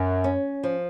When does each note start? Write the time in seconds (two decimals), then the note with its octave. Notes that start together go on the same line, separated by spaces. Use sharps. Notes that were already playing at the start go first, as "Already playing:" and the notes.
Already playing: F#2
0.24 C#4
0.63 F3